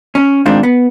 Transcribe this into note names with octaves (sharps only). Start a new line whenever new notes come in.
C#4
G#2 D#3 C4 D4 F4
B3